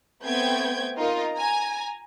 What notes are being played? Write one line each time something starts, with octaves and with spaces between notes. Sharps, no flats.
A3 B3 C4 G5 G6 G#6
D#4 F4 A#4 D#5
G#5 A#5